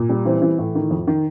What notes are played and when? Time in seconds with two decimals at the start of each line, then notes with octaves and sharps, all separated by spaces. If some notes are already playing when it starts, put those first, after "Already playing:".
Already playing: A#2
0.09 G3
0.25 E3 C4
0.42 E3
0.59 A2
0.75 D#3
0.91 F2
1.07 D#3